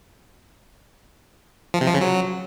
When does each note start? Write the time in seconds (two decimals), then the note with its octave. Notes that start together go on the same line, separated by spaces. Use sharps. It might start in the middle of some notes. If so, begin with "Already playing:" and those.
1.74 F3
1.81 C3
1.88 F3
1.94 C#3
2.01 F#3